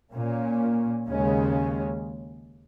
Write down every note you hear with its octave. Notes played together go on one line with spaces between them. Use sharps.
A#2 A#3 C#4
D#2 C#3 G#3 C#4